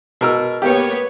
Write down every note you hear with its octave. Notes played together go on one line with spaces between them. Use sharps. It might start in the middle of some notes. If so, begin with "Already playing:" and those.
B2 A#4 E6
A#3 B3 G4 C#5